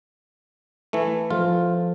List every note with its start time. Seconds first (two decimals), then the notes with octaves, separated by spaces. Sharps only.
0.93 E3 A3
1.30 F3 F4 A4 C5